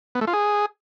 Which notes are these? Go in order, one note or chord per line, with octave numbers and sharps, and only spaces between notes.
B3
A3
F4
G#4